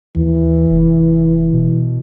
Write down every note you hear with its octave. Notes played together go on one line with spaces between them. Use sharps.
D#2 E3
F1
B2